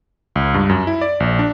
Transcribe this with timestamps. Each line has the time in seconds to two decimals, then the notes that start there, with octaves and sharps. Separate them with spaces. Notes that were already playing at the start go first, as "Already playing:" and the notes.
0.36 C#2
0.54 G2
0.69 F#2
0.87 E4
1.01 D5
1.20 A#1
1.39 D4